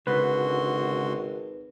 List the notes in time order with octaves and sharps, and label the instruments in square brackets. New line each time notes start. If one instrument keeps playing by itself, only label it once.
[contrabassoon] G#1 [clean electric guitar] C#2 [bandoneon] D3 F#4 C6 [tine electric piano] B4